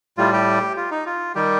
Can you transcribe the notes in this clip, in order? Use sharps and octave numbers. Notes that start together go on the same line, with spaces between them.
A2 G3 F4
G4
F4
D#4
F4
D#3 G3 G4